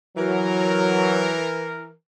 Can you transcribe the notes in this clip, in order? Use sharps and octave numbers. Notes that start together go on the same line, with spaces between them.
E3 F#3 A#4